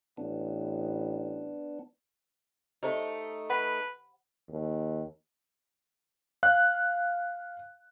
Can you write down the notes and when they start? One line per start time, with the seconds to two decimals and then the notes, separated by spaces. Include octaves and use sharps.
0.17 A1 B3 D4
2.83 A3 D#4 G4 C5
3.50 B4 F#5 B5
4.49 D#2
6.43 F5 F#6